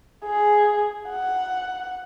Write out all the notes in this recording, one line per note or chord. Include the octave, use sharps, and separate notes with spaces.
G#4
F#5